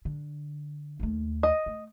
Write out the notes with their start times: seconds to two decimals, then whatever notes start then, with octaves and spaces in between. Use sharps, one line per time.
0.05 D3
1.00 D#2 A3
1.43 D#5
1.66 A3